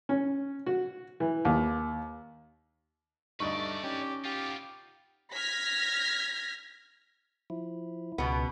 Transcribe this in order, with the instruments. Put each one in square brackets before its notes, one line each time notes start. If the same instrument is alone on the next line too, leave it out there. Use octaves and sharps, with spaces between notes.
[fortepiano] C#4
F#4
E3
D#2
[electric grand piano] D2 G2 D#4 [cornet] A3 [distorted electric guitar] B4 D5 [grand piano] D#5 C#6
[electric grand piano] C#4 D#4 [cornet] G4
[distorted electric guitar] B3 F4 [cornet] G4
[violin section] F6 G#6 A#6 B6
[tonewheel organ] F3 E4
[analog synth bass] C#2 [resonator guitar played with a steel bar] B2 B3